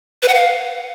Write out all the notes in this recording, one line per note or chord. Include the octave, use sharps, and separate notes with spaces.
B4
F#5
F5